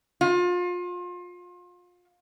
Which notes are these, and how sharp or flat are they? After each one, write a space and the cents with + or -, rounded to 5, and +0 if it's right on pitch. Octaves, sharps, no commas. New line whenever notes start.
F4 +30